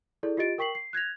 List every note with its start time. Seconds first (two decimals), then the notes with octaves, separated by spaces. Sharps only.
0.23 E4 G#4 A4 D5
0.37 F4 G4 D#5 A6 D7
0.58 A#4 G5 C#6 B6 C7 F#7
0.75 C7
0.93 F#6 G#6 A#6 F7